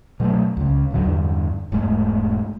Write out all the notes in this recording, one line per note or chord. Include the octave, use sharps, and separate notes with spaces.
B2 F#3 G#3 A3
C#2 C#3
D1 G#2 D3 F#3
E2 G2 D3
E1 G#2 G#3 A3